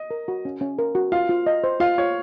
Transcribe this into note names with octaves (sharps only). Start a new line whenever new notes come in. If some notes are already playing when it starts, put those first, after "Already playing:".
Already playing: D#5
A#4
F#4
C#4
C#4
A#4
F#4
F4 F5
F4
D#5
C5
F4 F5
F4 C#5